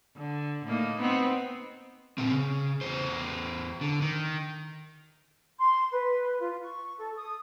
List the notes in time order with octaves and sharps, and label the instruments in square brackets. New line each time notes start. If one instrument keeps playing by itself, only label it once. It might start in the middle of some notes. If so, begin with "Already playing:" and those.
[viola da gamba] D3
A2 A#3 D#4
B3 C4 D#4
[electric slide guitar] A#2 C4
C#3
E2 C5
D3
D#3
[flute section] C6
B4
F4
C#6
A4
D#6